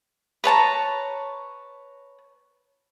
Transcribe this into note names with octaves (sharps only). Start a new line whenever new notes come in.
B4 C#5 A5 A#5